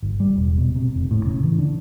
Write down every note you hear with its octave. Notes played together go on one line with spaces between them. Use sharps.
G1
G3
E1
B2
C3
F1
A2
C#3
E3
D3